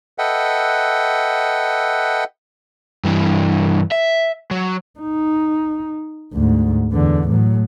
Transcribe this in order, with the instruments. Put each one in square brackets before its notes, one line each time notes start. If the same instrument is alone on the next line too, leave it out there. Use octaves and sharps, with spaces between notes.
[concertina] A4 B4 D#5 E5 F#5 G5
[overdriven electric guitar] G2 E3
E5
F#3
[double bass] D#4
D2 G#2
E2 D3
A2 F#3